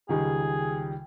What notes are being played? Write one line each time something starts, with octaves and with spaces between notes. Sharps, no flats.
C#2 D#3 G3 G#4